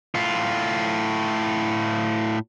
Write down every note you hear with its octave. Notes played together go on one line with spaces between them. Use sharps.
A2 F4